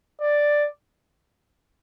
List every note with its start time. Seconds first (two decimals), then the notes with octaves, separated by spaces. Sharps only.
0.21 D5